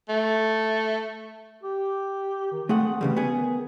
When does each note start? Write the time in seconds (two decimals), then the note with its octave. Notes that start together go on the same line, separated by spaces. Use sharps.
0.09 A3
1.63 G4
2.52 D#3
2.69 A3 C4 G#4 F#5
3.01 D2 C#3 E3 G3
3.16 B3 G#4
3.29 D#3